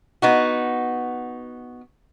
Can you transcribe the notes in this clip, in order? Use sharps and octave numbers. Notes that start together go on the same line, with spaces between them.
B3 D#4 F#4